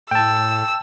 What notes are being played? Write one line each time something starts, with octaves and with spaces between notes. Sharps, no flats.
A2 G5 A5 E6